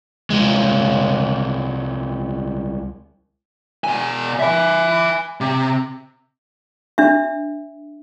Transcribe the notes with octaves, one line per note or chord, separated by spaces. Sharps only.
C2 G#3
B2 G#5
E5 G#5
C3
D4 E5